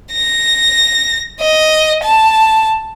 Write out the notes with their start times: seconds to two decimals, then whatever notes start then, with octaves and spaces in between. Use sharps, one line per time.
0.13 A#6
1.40 D#5
2.04 A5